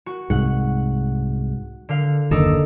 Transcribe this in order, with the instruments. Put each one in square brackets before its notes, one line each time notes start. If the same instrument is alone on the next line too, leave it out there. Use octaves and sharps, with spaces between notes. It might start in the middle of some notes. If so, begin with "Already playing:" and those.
[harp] F#4
[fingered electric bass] C2 G#2 [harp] F#5
[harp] D3 F5
[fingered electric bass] F#1 D#2 [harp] D4 D#4 A4